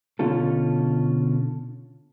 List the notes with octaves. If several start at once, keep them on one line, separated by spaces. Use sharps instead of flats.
B2 D3 C#4 F4 A4